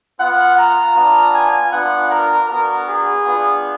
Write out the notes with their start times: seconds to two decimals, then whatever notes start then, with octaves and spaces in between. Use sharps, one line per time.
0.19 B3 F4 F#5
0.58 A#5
0.96 B3 D4 F4
1.34 G#5
1.72 B3 D4 F4 F#5
2.10 A#4
2.49 B3 D4 F#4 A#4
2.87 G#4
3.25 B3 D4 F4